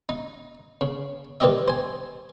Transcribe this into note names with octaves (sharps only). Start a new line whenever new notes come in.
D#4
C#3
D#3 E3 G3 G4 D#5 E5
C5 G#5